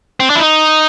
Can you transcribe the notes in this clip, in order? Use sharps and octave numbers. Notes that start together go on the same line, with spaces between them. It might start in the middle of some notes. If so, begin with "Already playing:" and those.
C4
D4
E4
D#4